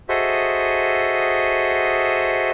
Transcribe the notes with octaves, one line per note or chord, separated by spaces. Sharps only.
F#4 G#4 A4 C5 D#5 E5